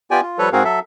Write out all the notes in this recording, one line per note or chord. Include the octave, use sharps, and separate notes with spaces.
B3 F4 G4 D5 G5 G#5
F4
F3 G3 A4 B4 C#5
G#2 C4 F#4 G#4 A#4 F5
F#3 A4 E5